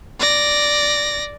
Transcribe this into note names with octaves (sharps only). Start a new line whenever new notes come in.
D5 A#6